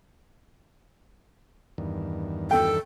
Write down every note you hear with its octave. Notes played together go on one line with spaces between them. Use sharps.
E2 G2 D#3
A4 G5